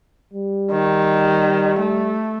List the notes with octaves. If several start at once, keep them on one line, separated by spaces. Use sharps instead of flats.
G3
D#3
A3